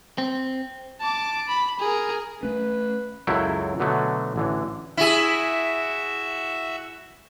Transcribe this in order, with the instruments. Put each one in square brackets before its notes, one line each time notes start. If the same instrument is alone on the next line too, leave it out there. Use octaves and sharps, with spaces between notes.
[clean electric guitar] C4
[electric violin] A5 D6
B5
G#4 A#4
[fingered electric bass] A3 C#4 [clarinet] B4
[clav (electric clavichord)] C#2 F#2 F#3 E4 A4 G5
B2 D3 F#3 A3
A1 D3 E3
[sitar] E4 G#4 [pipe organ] F#4 E5